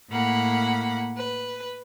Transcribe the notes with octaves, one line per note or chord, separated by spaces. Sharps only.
A2 A#3 F#5 B5
B4